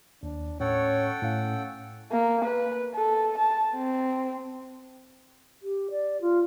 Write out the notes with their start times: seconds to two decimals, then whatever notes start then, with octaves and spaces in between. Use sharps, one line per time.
0.23 D#2 D4
0.60 A2 C#4 A4 C#5 F#5 G5
1.22 A2 C#4 F5
2.11 A#3
2.44 B4
2.95 A4
3.37 A5
3.75 C4
5.62 G4
5.90 D5
6.21 F4